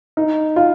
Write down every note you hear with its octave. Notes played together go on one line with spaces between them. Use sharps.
D#4
F4